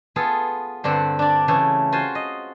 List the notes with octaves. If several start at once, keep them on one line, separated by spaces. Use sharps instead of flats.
B3 F4 G#4 A4
G2 D3 C4 G4 F#5
D4 D5
C#3 E3 A3
F4 F#4 C5 G#5
D#5